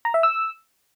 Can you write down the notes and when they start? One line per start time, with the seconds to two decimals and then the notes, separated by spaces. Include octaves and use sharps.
0.05 A#5
0.14 E5
0.23 E6